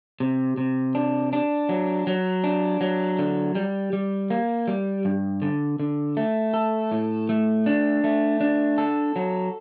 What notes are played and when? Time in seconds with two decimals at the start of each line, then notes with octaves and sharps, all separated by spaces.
0.20 C3
0.58 C3
0.95 D4
1.33 D4
1.69 F#3
2.07 F#3
2.44 D4
2.81 F#3
3.19 D3
3.55 G3
3.93 G3
4.30 A#3
4.68 G3
5.05 G2
5.42 D3
5.80 D3
6.17 A3
6.54 A4
6.92 A2
7.29 A3
7.66 D4
8.04 A3
8.41 D4
8.78 A4
9.16 F#3